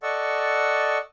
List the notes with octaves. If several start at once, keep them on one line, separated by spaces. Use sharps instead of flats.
A4 D5 D#5 F#5 C#6 E6